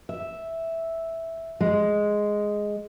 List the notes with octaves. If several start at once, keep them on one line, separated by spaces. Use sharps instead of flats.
E5
G#3